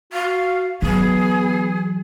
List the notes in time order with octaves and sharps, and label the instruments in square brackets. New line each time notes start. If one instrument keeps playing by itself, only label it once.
[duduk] F#4 [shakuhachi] F5
[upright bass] E3 F#3 [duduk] B3 [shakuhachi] G#4